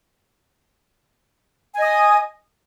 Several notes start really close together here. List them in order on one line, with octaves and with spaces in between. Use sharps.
G#5 D#5 D#6